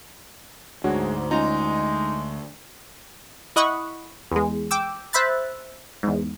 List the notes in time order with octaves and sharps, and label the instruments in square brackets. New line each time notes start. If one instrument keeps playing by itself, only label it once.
[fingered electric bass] D2 [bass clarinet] G#2 [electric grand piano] G#3 [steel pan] D4 F#4 C#5
[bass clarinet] G#3 [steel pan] C#4 F4 A#5 [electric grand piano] D#4
[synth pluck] E4 D#5 F#5 B5 C#6
E2 G#3
G5 D6 E6
C5 E5 B5 F#6 A6
E2 G#2